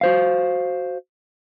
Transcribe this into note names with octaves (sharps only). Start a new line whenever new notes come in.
F#4 C5 F5